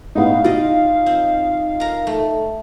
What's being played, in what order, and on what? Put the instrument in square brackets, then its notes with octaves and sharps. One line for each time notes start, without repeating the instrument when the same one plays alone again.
[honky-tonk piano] A2 B3 [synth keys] D#4 [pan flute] F5
[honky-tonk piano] F4 [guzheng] D5 D#5
[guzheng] C4
A#4 A#5
A3